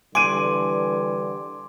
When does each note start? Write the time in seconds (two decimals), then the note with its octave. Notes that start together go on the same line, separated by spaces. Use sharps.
0.15 D3 E3 G3 G#5 C6 D6 D7 D#7